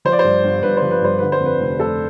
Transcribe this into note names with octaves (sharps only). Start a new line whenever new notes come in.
F3 C5
D5
C5
G2
G1
G1 B4
C5
F3
B4
G2 C5
D3 B4
C5
F2
B4
F1
F1 A4